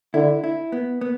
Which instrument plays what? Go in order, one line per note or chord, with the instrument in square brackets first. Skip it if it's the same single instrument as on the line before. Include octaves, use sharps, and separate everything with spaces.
[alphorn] D3 [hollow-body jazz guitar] E4
[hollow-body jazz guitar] E4
B3
B3